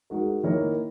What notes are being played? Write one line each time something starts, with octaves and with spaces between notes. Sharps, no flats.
G#3 D#4 F#4 A#4
D#3 A#3 E4 A#4 C#5